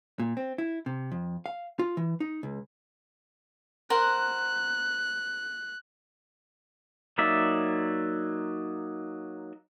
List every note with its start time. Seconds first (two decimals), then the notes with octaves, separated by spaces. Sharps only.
0.19 A#2
0.37 C4
0.58 E4
0.86 C3
1.12 F2
1.46 F5
1.79 F4
1.97 E3
2.20 D#4
2.43 C#2
3.90 A#4 C5 F#5 F#6
7.18 F#3 A#3 D#4 D5 E5